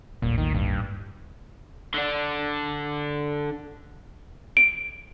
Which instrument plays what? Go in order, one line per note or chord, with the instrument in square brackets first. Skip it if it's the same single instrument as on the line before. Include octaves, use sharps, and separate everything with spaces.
[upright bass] A1 D#2 [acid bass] A#2
[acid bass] D#3
G2
[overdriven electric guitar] D3 D4
[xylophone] D7